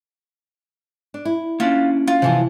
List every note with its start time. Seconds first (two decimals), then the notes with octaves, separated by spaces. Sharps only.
1.14 D4
1.25 E4
1.60 A#3 C#4 D4 F4
2.07 F4
2.22 E2 C3 E3 F3